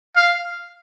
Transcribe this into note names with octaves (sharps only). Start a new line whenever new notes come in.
F5